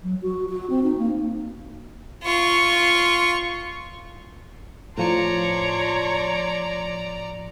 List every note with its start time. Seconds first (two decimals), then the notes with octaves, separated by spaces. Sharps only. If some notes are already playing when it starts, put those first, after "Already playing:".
0.04 F#3
0.22 F#4
0.49 F#4
0.70 C4
0.83 D#4
0.99 A#3
2.23 F4 C#6
4.98 A2 F3 C#5 D5 A5 A#5 C6 C#7